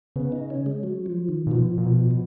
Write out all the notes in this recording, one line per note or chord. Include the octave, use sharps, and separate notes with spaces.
C#3 B3
D#4
C#4
G#3
F#3
F3
D#3
A#2
B2 F3
A#2
B2
F3